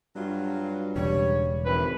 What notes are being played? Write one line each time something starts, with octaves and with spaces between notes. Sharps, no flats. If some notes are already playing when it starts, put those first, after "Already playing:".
G2 F#3 F4
E1 C#3 G3 C#5
G#1 E3 B4